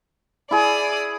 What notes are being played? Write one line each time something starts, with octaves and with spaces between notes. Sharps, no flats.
E4 G#4 D5 D#6